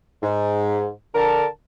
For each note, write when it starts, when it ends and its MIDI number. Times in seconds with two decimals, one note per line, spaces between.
0.23 0.87 44
1.15 1.46 50
1.15 1.46 70
1.15 1.46 81